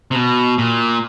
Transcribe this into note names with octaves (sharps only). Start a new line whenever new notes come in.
C3
B2
A#2